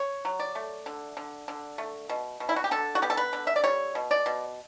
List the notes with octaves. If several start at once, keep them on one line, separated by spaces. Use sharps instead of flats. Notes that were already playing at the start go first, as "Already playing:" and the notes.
Already playing: C#5
F#3
D5
A3
D3
D3
D3
A3
B2
B2
E4
F#4
G4
D3 A4
F#4
B3 G4
A4
B4
D3
E5
D5
G3 C#5
B2
D5
B2